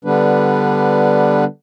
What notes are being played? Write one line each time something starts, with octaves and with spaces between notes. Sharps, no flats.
D3 G3 B3 D4 B4